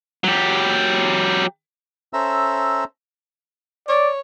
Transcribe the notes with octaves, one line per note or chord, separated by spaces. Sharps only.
F#3 G4
C#4 A4 C5 E5 A#5 E6
C#5 D5